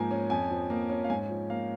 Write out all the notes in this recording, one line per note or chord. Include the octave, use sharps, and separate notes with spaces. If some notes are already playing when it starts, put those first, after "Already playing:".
Already playing: G#2 F3 A#3 G#5 A#5
C#4
F2 G#5
F3
A#3
C#4
F5
G#2 G#5
F3
A#3 F5